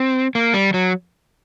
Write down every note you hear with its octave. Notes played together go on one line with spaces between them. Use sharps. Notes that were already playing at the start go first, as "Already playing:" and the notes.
Already playing: C4
A#3
G3
F#3